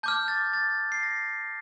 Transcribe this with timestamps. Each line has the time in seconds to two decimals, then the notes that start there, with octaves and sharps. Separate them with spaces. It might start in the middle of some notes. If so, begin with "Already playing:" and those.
0.03 A5 D6 F6 G6
0.28 A6
0.53 A6
0.92 C7
1.03 A#6